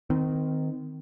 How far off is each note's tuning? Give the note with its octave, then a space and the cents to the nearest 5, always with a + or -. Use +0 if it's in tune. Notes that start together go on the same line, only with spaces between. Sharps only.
D#3 +0 C4 -30